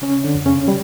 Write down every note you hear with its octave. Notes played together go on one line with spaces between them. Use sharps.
C#3 C#4
D3 D4
F2
C#3 C#4
G3